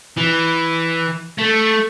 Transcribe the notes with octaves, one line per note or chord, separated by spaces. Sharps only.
E3
A3